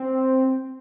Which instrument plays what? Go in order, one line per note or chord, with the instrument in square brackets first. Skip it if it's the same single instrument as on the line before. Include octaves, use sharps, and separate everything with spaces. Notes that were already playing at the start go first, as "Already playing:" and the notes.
Already playing: [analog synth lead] C4